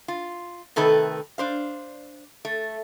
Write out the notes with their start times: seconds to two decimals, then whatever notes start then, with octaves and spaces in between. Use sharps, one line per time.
0.08 F4
0.76 C3 D#3 A3 A4 B4
1.38 D4 C5 F5
2.45 A3